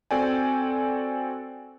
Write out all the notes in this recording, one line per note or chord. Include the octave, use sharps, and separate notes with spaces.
C4 F#4 A4 D5 G5 G#5